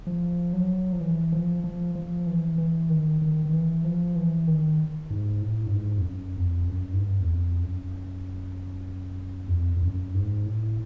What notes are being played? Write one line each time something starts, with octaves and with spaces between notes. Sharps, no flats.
F3
F#3
F3
E3
F3
F3
F3
E3
E3
D#3
D#3
D#3
E3
F3
E3
D#3
G#2
A2
G2
G#2
F2
F#2
F2
F#2
G#2
G2
E2
F2
F#2
E2
F2
F2
F#2
G#2
A2